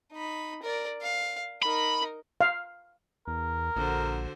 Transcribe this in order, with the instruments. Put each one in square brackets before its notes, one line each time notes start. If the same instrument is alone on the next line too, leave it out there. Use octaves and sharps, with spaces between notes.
[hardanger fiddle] D#4 B5
A#4 D5
F5
[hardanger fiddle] D#4 A#4 [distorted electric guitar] B5
[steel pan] F5
[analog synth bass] E2 [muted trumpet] A#4
[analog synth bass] A#1 [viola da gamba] D3 F#4 C5